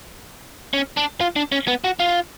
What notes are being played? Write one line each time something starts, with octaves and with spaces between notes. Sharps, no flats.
C#4
D4
F4
D4
C#4
B3
F#4
F4